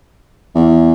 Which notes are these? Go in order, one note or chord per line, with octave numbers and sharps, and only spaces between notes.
E2